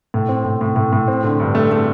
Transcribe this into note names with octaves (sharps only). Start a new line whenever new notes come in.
A2
C4
A2
A2
A2
A2
C4
D3
G2
A3
A3